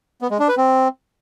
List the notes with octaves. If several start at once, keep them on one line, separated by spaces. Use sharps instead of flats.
B3
G#3
D4
B4
C4